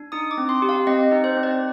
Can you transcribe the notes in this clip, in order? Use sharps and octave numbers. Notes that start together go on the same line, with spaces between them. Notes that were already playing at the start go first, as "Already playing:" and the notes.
Already playing: D4
D#4 D#6
D6
C4
C6
G4
F5
C4 D#5
D#4
C5
C4
D5